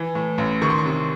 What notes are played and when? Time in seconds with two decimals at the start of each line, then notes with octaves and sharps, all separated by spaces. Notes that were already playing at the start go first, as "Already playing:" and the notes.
Already playing: E3
0.15 A2
0.38 A1
0.62 D#3 C#6
0.70 C6
0.78 C#6
0.86 C3